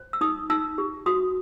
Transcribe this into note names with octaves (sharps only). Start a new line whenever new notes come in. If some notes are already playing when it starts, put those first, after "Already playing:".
Already playing: C5
E6
D#4 D#6
D#4 E6
G4
F#4 D#6